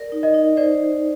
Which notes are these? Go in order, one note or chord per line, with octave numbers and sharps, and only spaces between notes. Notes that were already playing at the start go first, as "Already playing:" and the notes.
Already playing: A#4 D5
D#4
D#5
D#4
C5 D5